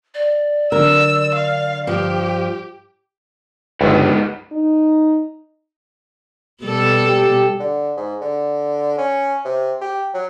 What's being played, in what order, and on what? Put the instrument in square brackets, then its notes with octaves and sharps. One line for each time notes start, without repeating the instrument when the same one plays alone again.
[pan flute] D5
[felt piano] D3 F#3 [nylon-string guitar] A#4 [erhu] E6
[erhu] F5
[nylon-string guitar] G2 F3 [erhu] G4
[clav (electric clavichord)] G1 C#2 [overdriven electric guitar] G#2 B3
[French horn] D#4
[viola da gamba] B2 G3 A4
[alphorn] G4
[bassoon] D3
G#2
D3
C#4
C3
G4
F#3